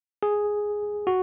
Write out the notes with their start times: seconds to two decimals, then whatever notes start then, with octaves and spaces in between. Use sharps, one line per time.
0.23 G#4
1.07 F#4